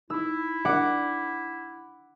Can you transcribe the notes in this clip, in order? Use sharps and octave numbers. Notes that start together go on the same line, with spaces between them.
D#4 E4 E6
D4 A#4 D5 F#5 D6